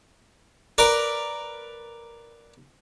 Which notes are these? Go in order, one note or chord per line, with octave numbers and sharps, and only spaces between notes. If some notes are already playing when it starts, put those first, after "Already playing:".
A#4 B4 D5